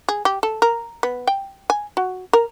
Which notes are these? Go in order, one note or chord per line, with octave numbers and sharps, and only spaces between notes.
G#4
G4
A4
A#4
B3
G5
G#5
F#4
A#4